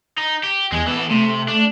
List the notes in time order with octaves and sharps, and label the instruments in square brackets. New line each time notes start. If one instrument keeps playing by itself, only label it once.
[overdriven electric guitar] D#4
G4
[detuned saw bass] E2 [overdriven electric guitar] G#3 G#4
[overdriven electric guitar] E3 A4 [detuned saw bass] B3
[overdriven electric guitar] C3 [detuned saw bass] A3
[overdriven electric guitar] D4